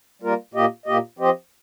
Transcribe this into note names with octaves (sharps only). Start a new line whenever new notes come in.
G3 A#3 F4 A#4
A#2 A#3 G4 D#5
A#2 A#3 G4 D#5
F3 C4 G4 C5 D#5